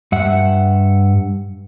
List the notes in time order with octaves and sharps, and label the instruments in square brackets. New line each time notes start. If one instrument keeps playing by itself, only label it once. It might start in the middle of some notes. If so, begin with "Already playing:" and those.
[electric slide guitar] G2 E5 F#5